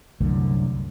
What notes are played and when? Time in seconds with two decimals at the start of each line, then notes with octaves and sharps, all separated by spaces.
0.20 C2 F#2 D3 A3